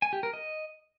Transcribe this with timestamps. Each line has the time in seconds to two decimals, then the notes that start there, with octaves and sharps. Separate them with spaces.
0.02 G#5
0.13 G4
0.23 A#4
0.34 D#5